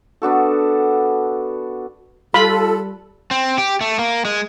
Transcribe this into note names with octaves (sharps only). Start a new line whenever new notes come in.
B3 D4 F#4 A4
G3 F4 A4 B5
C4
G4
A3
A#3
G#3